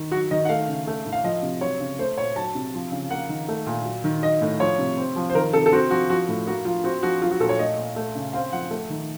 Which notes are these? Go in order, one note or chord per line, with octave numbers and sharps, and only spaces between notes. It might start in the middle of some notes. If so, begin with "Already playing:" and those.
Already playing: D#3
F#3 F#4
D#3 D#5
F#5
A3 F5
C#3
A3
A2
F5
F3 D#5
C3
F#3 C#5
C#3
A3 C5
A#2 C#5
F#3 A5
C3
F3
C#3
A#3 F#5
D#3
A3
A#2
F#3
D#3
F#3 D#5
A2
F3 C#5
C3
C4
F3
C5
D#3 A#4
C3 A4
A4
C4 F#4
F3 F#4
F3 F#4
A2
A#3 F#4
F3 F4
C4 F#4
F3 F#4
F#3 F4
F#4
A#2 A4
C#5
A3 D#5
A#2
A3
C#3
C4 F5
F3 F#5
A3
D#3